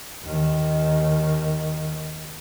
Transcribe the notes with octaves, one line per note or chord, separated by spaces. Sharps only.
D#2 D#3